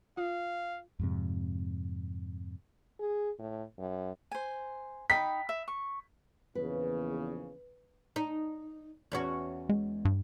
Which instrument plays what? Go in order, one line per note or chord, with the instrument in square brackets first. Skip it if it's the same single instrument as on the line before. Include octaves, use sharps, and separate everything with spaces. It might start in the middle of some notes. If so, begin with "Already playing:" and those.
[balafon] F4 [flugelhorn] F5
[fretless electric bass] F2 G#2 C3
[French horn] G#4
A2
F#2
[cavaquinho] C5 G#5
[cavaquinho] D#4 G5 B5 [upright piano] B6
[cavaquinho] E5
C#6
[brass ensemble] A#1 E2 C#3 [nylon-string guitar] B4
[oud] D#4
E2 C#4 F#4
[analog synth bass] G#3
G2